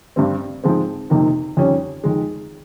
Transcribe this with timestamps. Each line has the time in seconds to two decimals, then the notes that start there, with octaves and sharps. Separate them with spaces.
0.16 G2 G3 C4
0.64 G#2 F3 G#3 C4
1.10 F2 C3 D#3 A#3 D#4
1.57 F2 D#3 G3 C#4
2.04 F2 D#3 G#3